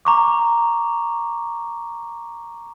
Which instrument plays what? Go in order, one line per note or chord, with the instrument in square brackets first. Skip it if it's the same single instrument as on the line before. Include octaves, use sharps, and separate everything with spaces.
[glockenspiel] A#5 C#6 D6